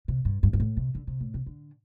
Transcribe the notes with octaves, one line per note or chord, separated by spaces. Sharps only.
C3
G2
G2
G2
A2
C3
D3
C3
A2
C3
D3